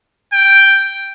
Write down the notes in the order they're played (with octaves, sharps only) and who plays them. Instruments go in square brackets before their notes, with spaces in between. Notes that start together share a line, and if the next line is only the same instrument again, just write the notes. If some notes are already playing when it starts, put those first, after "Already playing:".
[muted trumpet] G5